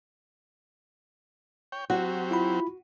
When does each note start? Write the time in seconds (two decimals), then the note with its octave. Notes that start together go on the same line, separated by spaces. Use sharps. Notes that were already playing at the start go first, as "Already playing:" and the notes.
1.72 C#5 G5
1.90 F#3 C4 F#4 G4
2.31 E4 F4 B5